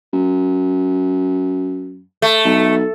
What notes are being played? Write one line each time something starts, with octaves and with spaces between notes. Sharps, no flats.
F#2
A3
B1